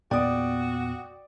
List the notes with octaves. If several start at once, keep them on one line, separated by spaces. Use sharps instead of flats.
E2 A#2 B3 F#4 D5 G5 D#6